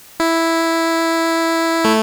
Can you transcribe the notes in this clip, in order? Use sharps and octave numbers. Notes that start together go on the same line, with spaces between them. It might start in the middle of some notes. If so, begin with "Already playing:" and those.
E4
A3